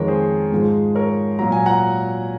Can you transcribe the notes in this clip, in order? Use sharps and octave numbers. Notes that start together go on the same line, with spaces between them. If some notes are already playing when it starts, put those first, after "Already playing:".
Already playing: F2 D#3 G#3 A#4 C#5
G#4 C5
G#2 F3 G#3
A#4 C#5
A#2 F#3 A#5
G#5
F#5 A#5